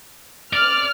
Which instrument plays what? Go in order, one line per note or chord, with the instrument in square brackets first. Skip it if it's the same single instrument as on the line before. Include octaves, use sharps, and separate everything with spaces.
[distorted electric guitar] D5 [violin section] F6